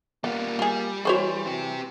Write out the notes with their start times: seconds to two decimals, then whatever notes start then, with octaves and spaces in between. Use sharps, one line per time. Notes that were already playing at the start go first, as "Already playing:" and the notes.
0.24 G3 A#3 B3 F4
0.59 G3 F4 G#4
1.05 E3 F#4 G#4 C5 C#5 C6 C#6
1.46 C4 G4